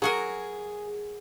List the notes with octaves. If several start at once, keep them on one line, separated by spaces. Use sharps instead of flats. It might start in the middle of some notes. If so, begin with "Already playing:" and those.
F#3 F#4 G#4 A#4